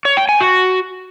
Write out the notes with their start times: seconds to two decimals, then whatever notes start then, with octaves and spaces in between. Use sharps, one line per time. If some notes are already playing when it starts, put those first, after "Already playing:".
0.05 C#5
0.17 G5
0.29 G#5
0.40 F#4